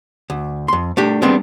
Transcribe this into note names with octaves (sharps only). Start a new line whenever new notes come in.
D2
F2 C6
A3 D4 G4
G3 G#3 B3 C4 D4